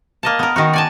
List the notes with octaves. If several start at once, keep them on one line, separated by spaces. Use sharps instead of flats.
A#3 D#5 A5
B3 A#4
D#3 D#4 F#4
D5 G#5 A5